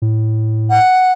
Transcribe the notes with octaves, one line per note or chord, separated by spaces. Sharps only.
A2
F#5